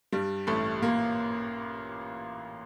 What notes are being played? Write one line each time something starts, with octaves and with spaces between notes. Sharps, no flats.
G2 G3
A1 A3
A#2 A#3